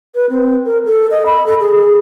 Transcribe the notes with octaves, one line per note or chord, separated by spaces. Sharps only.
B4
C4
A#4
A4
D#5
B5
A4
G#4
G#4